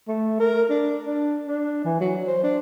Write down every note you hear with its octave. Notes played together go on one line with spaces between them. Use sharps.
A3
A#4
D4
D4
D4
E3
F#3
C5
D4